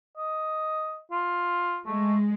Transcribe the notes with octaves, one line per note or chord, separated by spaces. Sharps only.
D#5
F4
G#3 A3